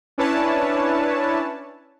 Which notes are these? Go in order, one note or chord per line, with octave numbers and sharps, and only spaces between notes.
C#4 D4 E4 B4 C#5 A5